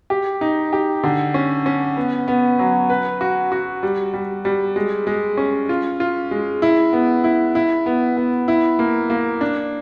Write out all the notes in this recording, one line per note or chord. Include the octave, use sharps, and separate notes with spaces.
G4
D#4
G4
D3
C#4
C#4
B3
B3
F#3
B4
F#4
F#4
G3
G3
G3
G#3
G#3
C#4
F4
F4
G#3
E4
B3
E4
E4
B3
B3
E4
A#3
A#3
D4